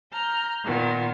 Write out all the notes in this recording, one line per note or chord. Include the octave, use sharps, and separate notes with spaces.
A#5 F6 G6
A#2 D#3 B3